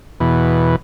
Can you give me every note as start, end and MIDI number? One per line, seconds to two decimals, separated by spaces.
0.20 0.76 40
0.20 0.76 47